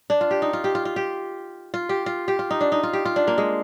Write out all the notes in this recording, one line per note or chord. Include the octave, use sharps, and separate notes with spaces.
D4
F4
G4
D#4
F4
G4
F4
F4
G4
F4
G4
F4
G4
F4
D#4
D4
D#4
F4
G4
F4
D4
A#3
G#3